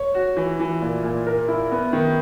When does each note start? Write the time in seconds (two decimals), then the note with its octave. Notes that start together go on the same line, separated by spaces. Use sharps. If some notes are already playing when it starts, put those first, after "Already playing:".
Already playing: C#5
0.14 F#4
0.36 E3
0.60 E3
0.82 A#2
1.03 A#2
1.27 A#4
1.48 E4
1.71 B3
1.93 D#3